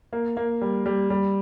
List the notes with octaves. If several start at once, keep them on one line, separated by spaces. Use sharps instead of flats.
A#3
A#3
G3
G3
G3